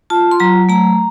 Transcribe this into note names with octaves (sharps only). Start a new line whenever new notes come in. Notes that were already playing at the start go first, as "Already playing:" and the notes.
F4 A5
C6
F#3 A#5
A3 A#5